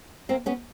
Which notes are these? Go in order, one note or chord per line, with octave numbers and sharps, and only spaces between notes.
A#3 C4
B3 C#4